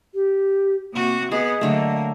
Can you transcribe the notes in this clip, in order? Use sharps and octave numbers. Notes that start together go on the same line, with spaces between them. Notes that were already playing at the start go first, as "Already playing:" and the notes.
G4
C3 A#3 F#4
B3 G#4 D#5
D3 F#3 A3 A#3